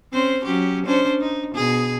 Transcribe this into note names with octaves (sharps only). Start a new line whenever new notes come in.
C4 C#4 C5
F#3 C#4 G4
C#4 D4 C5
D#4
B2 G#4